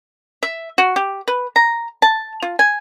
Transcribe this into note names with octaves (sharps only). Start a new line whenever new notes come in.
E5
F#4
G4
B4
A#5
A5
F4
G#5